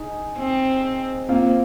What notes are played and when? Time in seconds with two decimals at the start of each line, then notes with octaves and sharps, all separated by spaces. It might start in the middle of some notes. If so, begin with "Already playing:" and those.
Already playing: D#4 G#4
0.39 C4
1.28 A#3 C4 F4